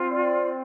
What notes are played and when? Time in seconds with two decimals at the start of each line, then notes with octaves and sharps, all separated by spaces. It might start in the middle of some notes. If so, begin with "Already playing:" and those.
Already playing: C4 F4
0.10 D5